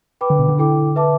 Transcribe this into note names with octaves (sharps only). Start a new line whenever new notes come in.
B4 G5 B5 D6
D3
B2
D3
E4 A4 G5 D6
B4 E5 A5 D6